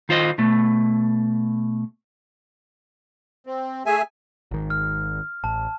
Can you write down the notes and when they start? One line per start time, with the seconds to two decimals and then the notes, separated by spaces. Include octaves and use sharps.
0.09 D#3 F4 C5 D#5
0.38 B2 A3
3.47 C4
3.86 A3 G#4 E5 G#5
4.51 G#1 D#3
4.70 F6
5.44 A1 A5